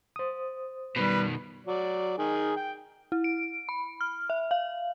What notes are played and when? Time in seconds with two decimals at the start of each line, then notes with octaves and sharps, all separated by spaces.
0.16 C5 D#6
0.96 B2 D#3 G3 B4
1.67 F#3 D5
2.18 D#3 G#4
2.57 G5
3.12 E4
3.24 D7
3.69 B5
4.01 F6
4.30 E5
4.51 F5